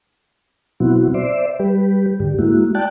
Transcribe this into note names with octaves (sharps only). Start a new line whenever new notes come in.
B2 F#3 B3 C4 E4 F#4
C5 D5 E5
G3 G4 B4
G#2 D3 G4
G#3 A#3 E4 F#4
D5 G5 A5 F#6